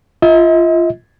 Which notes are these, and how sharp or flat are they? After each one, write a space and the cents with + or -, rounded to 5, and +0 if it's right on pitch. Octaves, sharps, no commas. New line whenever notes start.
F4 -20 D#5 +45